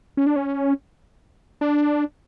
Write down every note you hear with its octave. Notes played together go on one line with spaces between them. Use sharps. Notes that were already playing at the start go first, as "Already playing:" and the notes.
C#4
D4
C#4
D4